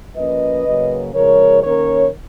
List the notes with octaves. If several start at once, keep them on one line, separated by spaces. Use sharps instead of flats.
F3 A#3 C#4 B4 D#5
C#3 F#3 A#3 C#4
C#3 F3 G#3 A#4 C#5
D#3 A#3 C#4 A#4 C#5